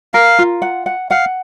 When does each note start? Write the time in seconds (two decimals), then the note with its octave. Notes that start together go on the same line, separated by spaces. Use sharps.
0.14 A#4 F5
0.39 F4
0.62 F#5
0.86 F#5
1.11 F5 F#5